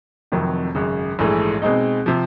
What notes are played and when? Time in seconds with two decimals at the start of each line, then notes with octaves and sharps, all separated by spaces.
0.32 F1 F2 C3 D#3 F#3
0.75 G#1 F#2 C#3
1.19 A#1 G#2 E3 A3
1.62 B2 G#3 C4 D#4
2.06 C3 F3